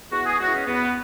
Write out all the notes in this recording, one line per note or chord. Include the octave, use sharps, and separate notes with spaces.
E2 F#4
G#4
C#3 G#3 B3 F#4
E4
C#4
E2 B3